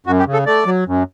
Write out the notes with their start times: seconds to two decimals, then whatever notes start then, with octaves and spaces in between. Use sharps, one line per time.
0.06 F#2 F#4
0.19 G4
0.26 C#3
0.33 A4
0.46 A3 D5
0.66 F#3
0.87 F#2